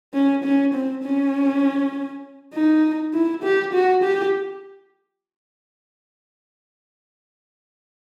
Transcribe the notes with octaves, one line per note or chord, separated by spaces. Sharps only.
C#4
C#4
C4
C#4
D#4
E4
G4
F#4
G4